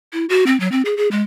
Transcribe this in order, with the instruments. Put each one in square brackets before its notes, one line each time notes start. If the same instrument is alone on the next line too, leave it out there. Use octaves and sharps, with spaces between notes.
[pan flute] E4
F#4
C4
F#3
C4
G#4
G#4
G#3